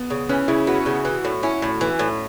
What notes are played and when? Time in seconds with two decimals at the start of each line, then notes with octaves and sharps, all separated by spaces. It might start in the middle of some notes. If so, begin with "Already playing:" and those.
Already playing: B3
0.10 C#3
0.29 E3 C#4
0.48 C#3 E4
0.67 B3 F#4
0.86 C#3
1.05 E3
1.25 A2
1.43 C#4 E4
1.62 A2
1.81 E3
1.99 A2